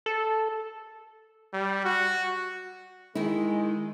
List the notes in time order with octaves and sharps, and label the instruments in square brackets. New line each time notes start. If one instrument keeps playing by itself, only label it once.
[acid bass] A4
[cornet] G3
F#4
[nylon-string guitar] D#3 E4 [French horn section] G#3